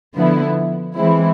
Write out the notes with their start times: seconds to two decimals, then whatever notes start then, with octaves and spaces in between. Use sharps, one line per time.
0.15 D3 F3 B3 E4
0.96 E3 G#3 C4 E4